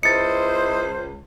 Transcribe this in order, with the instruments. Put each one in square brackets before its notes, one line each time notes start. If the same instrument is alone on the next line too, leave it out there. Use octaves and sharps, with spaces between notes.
[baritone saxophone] C#2 [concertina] E4 D#5 [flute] C5 [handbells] A6 C#7